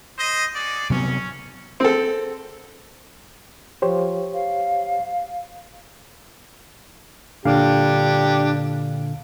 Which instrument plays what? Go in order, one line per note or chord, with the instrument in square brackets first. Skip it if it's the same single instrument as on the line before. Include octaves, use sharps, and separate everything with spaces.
[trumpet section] C5 D#5
F#4 G#4 D5
[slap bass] C3 F#3 B3 [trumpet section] C#4
[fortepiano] C4 A4
[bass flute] F3 [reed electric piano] G4 C5 C#5
[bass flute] F5
[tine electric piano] A#2 D3 F5 [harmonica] D4 G4